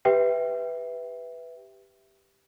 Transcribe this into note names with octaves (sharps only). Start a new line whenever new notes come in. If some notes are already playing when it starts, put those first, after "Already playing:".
G4 B4 E5 G5